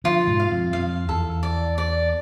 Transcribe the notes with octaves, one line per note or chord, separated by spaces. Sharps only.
D3 F3 F4
G#2 B2
F5
F2
F2 F5
E2 A4
D5
D5